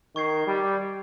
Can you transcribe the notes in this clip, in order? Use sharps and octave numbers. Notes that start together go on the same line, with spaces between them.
D#3 C#6 G#6 C7
G3